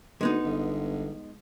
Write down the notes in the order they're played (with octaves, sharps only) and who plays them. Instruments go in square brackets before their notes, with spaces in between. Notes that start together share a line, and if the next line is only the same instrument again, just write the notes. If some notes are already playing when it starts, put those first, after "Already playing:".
[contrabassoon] D2 [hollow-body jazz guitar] G#3 B3 D#4
[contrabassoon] G1